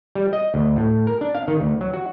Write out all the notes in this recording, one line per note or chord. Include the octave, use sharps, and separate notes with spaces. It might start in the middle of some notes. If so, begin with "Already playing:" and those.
G3
D#5
D2
A2
A#4
D4
F5
D#3
D2
F#3
F#4